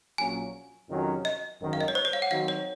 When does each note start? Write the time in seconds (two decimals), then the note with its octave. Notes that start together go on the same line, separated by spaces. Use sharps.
0.18 A#1 A#2 F#3 A#3 C#4 G#5
0.89 F2 C3 D#3 F#3 C#4
1.25 D#5
1.61 G#1 F#2 D#3
1.73 F5
1.81 D#5
1.88 C#5
1.95 C5
2.05 C#5
2.13 F5
2.22 F#5
2.31 D#3 F#3 C4 D#4 F#4 F5
2.48 C#5